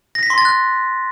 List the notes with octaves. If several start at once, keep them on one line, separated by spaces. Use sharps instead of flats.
A#6
B6
C6
A6
F#6